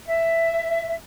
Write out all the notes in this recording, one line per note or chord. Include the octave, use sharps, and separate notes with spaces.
E5